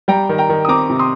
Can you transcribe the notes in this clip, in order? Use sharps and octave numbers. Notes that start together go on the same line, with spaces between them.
G3 G5 A#5
D#3
G5 A#5
D#3
D#6
C4 A#5 D6
C3
C6 D#6